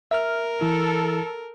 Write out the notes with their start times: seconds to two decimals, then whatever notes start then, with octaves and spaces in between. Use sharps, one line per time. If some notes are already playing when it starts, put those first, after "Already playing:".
0.11 A#4 E5 F6
0.61 E3 E4 A4